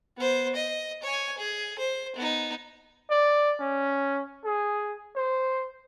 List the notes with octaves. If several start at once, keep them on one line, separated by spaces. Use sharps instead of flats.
B3 C5
D#5
C#5 G#5
G#4
C5
B3 D#4
D5
C#4
G#4
C5